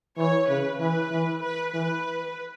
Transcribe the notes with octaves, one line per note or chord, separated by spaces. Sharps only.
E3 C#5
C#3 B4
E3 B4
E3
B4
E3 B4